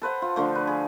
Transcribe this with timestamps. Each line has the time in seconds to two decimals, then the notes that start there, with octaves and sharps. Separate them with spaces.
0.02 A4 B4 C5 F#5
0.22 F4
0.36 D3 F3 A3
0.55 B4
0.67 G#4